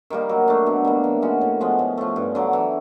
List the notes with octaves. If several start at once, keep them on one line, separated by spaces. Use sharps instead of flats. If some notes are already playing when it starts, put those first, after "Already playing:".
D#3 G3 A#3
F#3
A3 D4
B2
G3 A#3
E3
G#3 C#4 F#4
A2
F3 G#3 B3
A2
F3 A3
G2
D3 F#3
E3